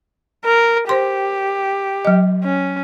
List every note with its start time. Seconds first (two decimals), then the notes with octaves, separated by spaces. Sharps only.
0.45 A#4
0.89 G4 C5 C6
2.05 F#3 D#5
2.44 C#4